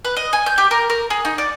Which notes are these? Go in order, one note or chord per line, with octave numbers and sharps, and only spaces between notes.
B4
D#5
G#5
G6
G4
A#4
A#4
G#4
D#4
D5